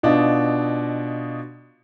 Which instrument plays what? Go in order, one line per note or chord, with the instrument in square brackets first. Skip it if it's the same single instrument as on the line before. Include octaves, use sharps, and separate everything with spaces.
[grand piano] B2 D4 D#4 F4